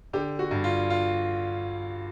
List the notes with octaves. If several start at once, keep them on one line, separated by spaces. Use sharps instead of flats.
D3 G4
F#4
G2
F4
F4